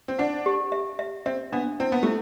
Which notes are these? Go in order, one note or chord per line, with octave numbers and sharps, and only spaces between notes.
C4
D4 F#5
G4
E5
E5
C4 E5
B3 D4
C4 E4
B3
A3 E4